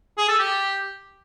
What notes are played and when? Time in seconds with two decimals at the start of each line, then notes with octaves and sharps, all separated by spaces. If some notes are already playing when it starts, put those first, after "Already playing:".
0.18 G#4
0.28 A4
0.39 G4